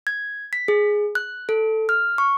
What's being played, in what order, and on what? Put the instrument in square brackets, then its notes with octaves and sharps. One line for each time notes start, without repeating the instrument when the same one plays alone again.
[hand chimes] G#6
B6
G#4
F#6
A4
F6
C#6